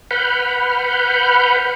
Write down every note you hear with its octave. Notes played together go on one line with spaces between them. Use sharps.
B4 F#5 B5 F6 G6